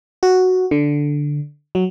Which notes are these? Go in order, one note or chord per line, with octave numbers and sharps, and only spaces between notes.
F#4
D3
F#3